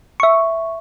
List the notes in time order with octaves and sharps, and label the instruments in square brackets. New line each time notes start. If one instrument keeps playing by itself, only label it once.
[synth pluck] E5 C#6